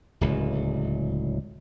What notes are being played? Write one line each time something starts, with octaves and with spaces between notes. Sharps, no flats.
D1 C#2